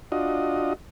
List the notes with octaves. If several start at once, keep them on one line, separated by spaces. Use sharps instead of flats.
D4 F4 F#4 D#5